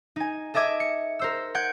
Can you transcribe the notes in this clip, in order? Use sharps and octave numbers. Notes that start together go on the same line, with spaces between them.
D#4 G#5
A4 D#5 E5 D6 G#6
C#7
A#4 C5 E6
F#5 G6 G#6 D7